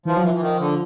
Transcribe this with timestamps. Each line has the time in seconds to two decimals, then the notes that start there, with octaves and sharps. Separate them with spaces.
0.05 E3 F3
0.17 F#3
0.23 E3 F3
0.34 E3
0.41 D#3
0.59 D3